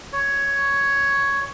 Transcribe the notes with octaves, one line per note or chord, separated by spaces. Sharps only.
C#5